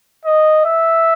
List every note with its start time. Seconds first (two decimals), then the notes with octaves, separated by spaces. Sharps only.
0.25 D#5
0.65 E5